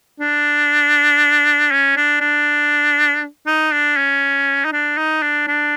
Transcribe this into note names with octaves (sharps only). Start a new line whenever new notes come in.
D4
C#4
D4
D4
D#4
D4
C#4
D#4
D4
D#4
D4
D4